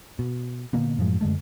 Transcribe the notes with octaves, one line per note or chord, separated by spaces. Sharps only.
B2
A#2 D3 A#3 B3
F#2 A2 F3 G#3
F#2 D3 G#3 A3